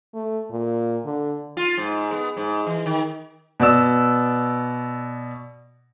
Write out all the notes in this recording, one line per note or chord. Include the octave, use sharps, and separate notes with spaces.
A3
A#2
D3
F4
G#2
B3
G#2
E3
D#3
B2 B3 D5 E6 E7